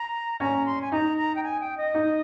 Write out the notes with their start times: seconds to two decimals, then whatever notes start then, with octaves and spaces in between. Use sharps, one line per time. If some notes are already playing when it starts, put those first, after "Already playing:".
Already playing: A#5
0.40 C#4 A#5
0.66 C6
0.82 G#5
0.92 D#4 A#5
1.18 A#5
1.35 G5
1.43 G#5
1.60 G5
1.78 D#5
1.94 D#4